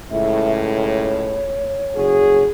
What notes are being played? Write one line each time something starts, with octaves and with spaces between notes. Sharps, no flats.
C#2 A2 E5
C#5
F#1 F#4 G#4